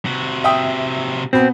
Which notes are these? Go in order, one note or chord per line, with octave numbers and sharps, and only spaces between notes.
C3 F#4
E5 G5 D#6
B2 B3 C4